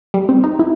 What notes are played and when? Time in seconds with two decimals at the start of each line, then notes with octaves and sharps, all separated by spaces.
0.14 G3
0.29 C4
0.44 D#4
0.59 E4